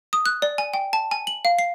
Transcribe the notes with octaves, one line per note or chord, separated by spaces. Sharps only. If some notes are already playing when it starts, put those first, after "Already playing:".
D#6
F#6
D5
G#5
G5
A5
G#5
F#7
F5
C7